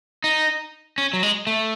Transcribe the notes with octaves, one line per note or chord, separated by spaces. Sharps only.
D#4
C#4
F#3
G#3
A3